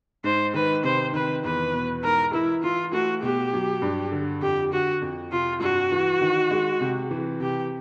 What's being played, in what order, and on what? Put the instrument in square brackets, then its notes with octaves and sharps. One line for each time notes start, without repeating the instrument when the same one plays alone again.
[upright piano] G#2 [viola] C5
[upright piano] D#3 [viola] B4
[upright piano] C3 [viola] C5
[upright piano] D#3 [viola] B4
[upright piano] E2 [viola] B4
[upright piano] B2
[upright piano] G#2 [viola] A#4
[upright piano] E3 [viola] E4
[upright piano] E3 [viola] F4
[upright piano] A3 [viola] F#4
[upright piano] B2 [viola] G4
[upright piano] F#3
G2
D3
[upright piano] F2 [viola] G4
[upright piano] D3 [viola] F#4
[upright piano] F2
[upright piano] C3 [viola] F4
[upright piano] G2 [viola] F#4
[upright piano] E3
D#3
G#3
C3
E3
[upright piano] C3 [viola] G4